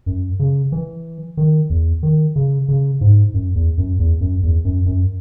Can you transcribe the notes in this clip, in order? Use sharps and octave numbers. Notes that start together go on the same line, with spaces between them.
F#2
C#3
E3
D#3
E2
D#3
C#3
C#3
G#2
F#2
E2
F#2
E2
F#2
E2
F#2
F#2